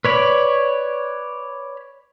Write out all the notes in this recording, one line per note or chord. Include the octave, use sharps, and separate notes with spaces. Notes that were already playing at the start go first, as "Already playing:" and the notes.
B4 C#5 D5 B5